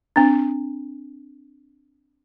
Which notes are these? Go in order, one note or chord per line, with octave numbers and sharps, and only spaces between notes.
C4 D4